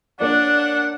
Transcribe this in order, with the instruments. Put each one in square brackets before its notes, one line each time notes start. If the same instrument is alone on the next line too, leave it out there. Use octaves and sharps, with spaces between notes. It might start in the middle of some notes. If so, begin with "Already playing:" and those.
[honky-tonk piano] A#3 C#5 D5 [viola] D4 [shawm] F#5